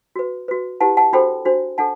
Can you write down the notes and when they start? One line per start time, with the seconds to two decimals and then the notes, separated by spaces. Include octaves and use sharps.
0.16 F#4 B4
0.48 F#4 B4
0.81 E4 G4 B4 F#5 A5
0.97 F#5 A5
1.13 D4 F#4 A4 C5 G5 B5
1.45 D4 F#4 C5
1.78 D4 A4 F#5 A5